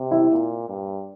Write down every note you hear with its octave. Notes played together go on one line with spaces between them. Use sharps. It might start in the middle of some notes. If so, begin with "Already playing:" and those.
Already playing: C3
E4
A#2
G2